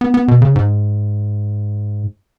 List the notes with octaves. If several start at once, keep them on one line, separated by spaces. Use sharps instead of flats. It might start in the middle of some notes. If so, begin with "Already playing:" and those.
B3
B3
B2
C#3
G#2